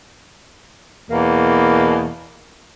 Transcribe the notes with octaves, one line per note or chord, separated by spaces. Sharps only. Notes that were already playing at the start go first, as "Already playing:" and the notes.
E2 B2 A#3